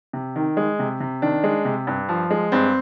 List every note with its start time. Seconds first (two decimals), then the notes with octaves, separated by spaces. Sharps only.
0.13 C3
0.36 D#3
0.57 G#3
0.79 C3
1.00 C3
1.22 D#3 D4
1.44 G#3
1.65 C3
1.87 G2
2.09 F3
2.31 G#3
2.52 G2 C4